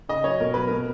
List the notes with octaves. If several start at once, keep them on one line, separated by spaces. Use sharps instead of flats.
C#3 D#5
F#3 C#5
B2 A#4
F#3 B4
B2 A#4